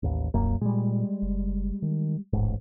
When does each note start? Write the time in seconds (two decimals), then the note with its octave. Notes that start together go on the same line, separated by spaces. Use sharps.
0.03 A1 D#2
0.34 D#1 C2 F#2 A#3
0.61 A#2 G3 G#3
1.22 F#1
1.82 D#3
2.33 D1 A1 G#2